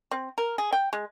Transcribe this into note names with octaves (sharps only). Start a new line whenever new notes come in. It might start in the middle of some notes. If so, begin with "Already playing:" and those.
C4
A#4
G#4
G5
G#3